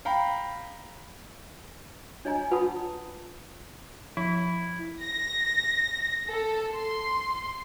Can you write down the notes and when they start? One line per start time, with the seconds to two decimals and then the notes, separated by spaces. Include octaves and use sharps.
0.05 F5 G5 A#5 B5
2.25 D4 C#5 D#5 G#5 A#5
2.51 F4 B4 F#5 A5 B5 D#6
4.17 F3 E4
5.03 A#6
6.30 A4
6.76 C6